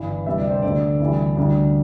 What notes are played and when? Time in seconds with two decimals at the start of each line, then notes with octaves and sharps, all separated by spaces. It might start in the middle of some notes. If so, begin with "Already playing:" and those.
Already playing: G1 G2 E3
0.26 D2 C3 G3 E5
0.38 D5
0.50 C5
0.62 D2 D3 A3 A4 D5
1.00 D2 C3 E3 G3
1.37 D2 D3 G3